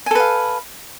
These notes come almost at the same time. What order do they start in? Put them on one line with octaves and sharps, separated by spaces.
G#5 A4 B4 F5